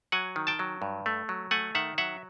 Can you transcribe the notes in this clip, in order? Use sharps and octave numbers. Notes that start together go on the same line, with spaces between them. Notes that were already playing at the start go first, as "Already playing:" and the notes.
F#3 F#5 G#5
D#3
G5 A5
F#3
G2
A3
F#3
A3 F#5 G#5
D#3 E5 F#5
F#3 E5 F#5